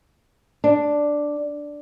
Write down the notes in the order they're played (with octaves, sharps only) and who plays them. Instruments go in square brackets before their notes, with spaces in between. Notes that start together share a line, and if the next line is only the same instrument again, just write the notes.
[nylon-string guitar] D4